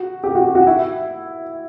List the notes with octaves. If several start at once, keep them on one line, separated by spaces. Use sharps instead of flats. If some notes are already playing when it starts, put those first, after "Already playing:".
Already playing: F#4
G4
F#4
G4
F#4
E4